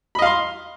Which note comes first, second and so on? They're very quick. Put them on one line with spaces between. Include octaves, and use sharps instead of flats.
B5 D#5 F5 C6